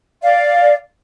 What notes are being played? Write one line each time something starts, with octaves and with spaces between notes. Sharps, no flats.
D5 F5